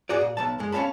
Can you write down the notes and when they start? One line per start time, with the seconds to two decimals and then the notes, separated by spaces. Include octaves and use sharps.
0.09 G2 F#4 G#4 D5
0.21 A#2
0.37 B1 F#3 A5
0.59 F#2 G#3
0.72 C#4 C#5 E5 F5 A5 B5